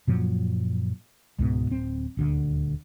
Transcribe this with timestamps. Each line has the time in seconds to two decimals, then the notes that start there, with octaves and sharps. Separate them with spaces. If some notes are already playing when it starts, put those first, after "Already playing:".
0.07 F#2 A#2 F3 F#3
1.39 C#2 G#2 B2
1.70 D1 C4
2.17 D#1 D2 D3